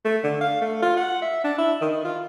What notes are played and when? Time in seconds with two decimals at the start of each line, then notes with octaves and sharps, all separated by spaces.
0.05 A3
0.24 D3
0.41 F5
0.61 A3
0.82 F4
0.97 F#5
1.22 E5
1.44 D4
1.58 E4
1.81 D#3
2.05 F4